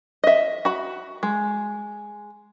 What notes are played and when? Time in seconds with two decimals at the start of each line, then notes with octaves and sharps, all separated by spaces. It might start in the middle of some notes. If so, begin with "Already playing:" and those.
0.24 D#5 E5
0.65 F#4 B5
1.23 G#3